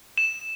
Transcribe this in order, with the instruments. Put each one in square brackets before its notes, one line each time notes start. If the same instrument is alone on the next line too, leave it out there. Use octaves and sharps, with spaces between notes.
[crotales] E7